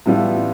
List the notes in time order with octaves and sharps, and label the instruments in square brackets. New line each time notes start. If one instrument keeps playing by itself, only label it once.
[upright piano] A2 E3 G3 B3 F4